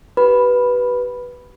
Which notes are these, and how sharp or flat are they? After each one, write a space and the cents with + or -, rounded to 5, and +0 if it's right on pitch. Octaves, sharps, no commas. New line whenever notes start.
G4 -40 B4 -5 B5 +0